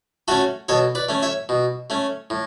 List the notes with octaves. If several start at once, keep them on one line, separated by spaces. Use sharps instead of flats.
A3 C#4 F#4 A4
B2 A4 C#5
B4 D5
A3 C#4
C#5 E5
B2
A3 C#4
A2